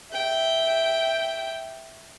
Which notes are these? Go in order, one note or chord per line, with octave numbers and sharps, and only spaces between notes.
E5 G5